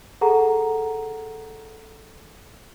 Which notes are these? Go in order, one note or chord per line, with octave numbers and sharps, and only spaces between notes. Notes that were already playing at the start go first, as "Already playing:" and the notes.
G#4 A4 F#5 A#5